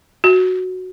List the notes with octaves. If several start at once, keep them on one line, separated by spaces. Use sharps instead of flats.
F#4